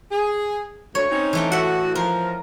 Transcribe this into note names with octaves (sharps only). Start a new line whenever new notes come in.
G#4
D2 C#5
C4 C#4 D#4
E3 A3 G5
A2 F#4 E5 F#5
F3 A#4